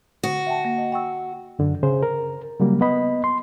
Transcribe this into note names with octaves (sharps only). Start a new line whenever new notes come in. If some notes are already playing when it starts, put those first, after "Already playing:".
D3 F#4
E5 G5 A5
A#3
D#5
G5 C#6 E6
F#2 D3
C#3 G#4 C5
A#4
C#3 F#3 G3 A#3
B3 D#5 B5
C6